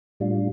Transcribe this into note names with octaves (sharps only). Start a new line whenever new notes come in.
A2 G3 D4 F4